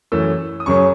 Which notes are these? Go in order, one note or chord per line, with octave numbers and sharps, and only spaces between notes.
F#2 E3 A3 C#4 E6
D#6
F#2 C#3 F#3 C#4 C#6